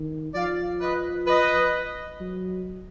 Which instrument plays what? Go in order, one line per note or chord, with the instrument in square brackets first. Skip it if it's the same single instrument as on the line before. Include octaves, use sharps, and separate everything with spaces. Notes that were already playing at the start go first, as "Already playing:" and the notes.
Already playing: [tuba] D#3
[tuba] F3 [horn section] D5 F5
[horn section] B4 D#5
B4 D#5
[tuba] F#3